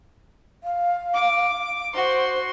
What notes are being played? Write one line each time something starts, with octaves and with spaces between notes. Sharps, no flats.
F5
D6
F#4 C5 C6